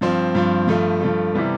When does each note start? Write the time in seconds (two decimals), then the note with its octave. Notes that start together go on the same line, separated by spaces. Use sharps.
0.01 G2 F3 C4
0.35 G2 F3 C4
0.68 G2 F3 A3
1.01 G2 F3 A3
1.34 C3 E3 G3 B3